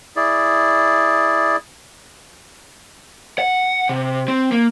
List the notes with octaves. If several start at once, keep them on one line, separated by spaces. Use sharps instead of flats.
E4 G#4 D5
F#5
C3
C4
A#3